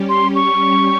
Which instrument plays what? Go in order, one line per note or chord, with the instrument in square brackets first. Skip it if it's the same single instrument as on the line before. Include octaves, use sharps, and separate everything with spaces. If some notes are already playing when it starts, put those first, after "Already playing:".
Already playing: [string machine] G3 C#4 G4
[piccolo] C6
C#6